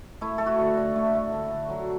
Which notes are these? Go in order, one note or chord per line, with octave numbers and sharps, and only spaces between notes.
A3 E4
A3 A4
F#4
D3
D3
A3
A3
D3
D3
F#3